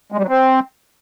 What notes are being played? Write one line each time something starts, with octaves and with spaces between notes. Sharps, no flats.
G#3
G3
F#3
C4